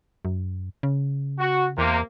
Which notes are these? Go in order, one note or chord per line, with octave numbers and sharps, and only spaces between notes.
F#2
C#3
F#4
E2 C3 A#3